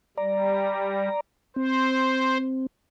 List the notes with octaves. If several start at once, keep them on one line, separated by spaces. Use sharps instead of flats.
G3 D5 A#5
C4 C5